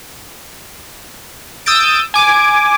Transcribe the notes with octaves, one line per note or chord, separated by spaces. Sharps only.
D#6 E6 G6 A6 D7
G#5 D6